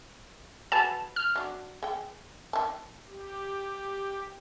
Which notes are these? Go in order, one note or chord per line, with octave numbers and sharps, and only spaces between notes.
F#4 G#4 B4 A5
F6
F#3 D4
G#3 G5
D#3 A5
G4